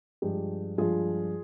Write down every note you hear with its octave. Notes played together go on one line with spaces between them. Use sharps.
G2 F3 G#3 G4
G2 F3 G#3 F4 G#4